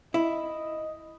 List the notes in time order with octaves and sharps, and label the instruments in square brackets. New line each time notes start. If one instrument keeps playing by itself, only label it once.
[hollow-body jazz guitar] E4 [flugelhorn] D#5